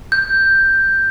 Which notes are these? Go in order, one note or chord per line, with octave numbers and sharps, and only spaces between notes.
G6